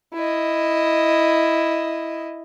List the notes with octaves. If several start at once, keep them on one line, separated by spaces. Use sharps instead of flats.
E4 D#5